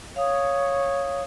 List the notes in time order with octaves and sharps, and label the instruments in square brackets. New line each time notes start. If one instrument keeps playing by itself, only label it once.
[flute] C#5 [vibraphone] F5 D#6